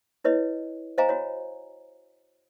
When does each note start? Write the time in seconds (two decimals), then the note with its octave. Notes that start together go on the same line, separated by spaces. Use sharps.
0.24 E4 B4 C#5 D#5
0.98 C5 D#5 F5 G#5 A#5
1.09 F#4 C#5